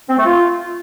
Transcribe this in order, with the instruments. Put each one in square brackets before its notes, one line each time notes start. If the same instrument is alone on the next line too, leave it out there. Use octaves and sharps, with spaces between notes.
[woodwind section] C4
A3
F4